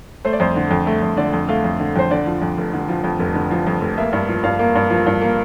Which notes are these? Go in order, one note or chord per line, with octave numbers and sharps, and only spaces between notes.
A3 C5
D5
F2 C5
D3
F2
A3
F2
D3 D5
F2
A3 F5
F2
D3
F2 C5
D3 D5
F3
F2
F1
D3
F3
F2
F1
D3
F3
F2
F1
A#3 E5
G2
F3
G2 F5
A#3
G2
F3
G2
A#3